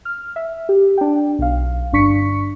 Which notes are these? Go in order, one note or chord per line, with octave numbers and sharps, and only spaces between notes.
F6
E5
G4
D4 G5
B1 F5
G1 G2 D4 C#6 B6 C#7